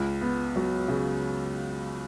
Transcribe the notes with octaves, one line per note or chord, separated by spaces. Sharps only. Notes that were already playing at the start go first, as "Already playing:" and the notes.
Already playing: C#2
B3
F#3
C#3